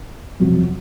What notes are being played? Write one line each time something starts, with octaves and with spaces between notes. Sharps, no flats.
F2 C3 F#3